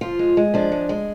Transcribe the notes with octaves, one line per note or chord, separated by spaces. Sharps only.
F3 F4
G#3
G#3
F3 D4
G#3
G#3